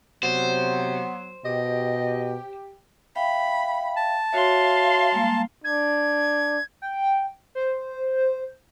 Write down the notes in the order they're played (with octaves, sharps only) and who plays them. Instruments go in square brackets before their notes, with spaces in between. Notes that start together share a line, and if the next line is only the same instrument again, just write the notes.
[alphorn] C3 [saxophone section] F#3 [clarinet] B3 [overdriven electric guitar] C5
[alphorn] B2 [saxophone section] G4 [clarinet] D#5
[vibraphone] E5 F5 G5 [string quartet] B5
[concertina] A5
[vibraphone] F#4 C#5 E5 [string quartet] F5 C6
[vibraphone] G3 G#3 A#3
[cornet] D4 [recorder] G#6
[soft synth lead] G5
C5